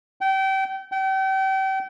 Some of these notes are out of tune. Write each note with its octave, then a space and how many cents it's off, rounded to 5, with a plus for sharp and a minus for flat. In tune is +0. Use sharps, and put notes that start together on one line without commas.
G5 -30
G5 -35